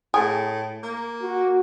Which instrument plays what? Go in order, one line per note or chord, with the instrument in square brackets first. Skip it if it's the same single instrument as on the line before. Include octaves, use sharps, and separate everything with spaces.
[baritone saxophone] A2 [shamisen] G#4
[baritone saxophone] A#3
[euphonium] F#4